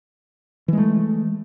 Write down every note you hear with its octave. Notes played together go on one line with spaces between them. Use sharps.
E3 G#3 A3